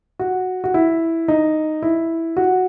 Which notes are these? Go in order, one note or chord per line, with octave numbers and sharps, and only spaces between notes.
F#4
F#4
E4
D#4
E4
F#4